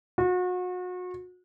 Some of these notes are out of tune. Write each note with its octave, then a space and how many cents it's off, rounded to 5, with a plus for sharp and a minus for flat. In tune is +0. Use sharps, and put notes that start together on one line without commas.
F#4 -35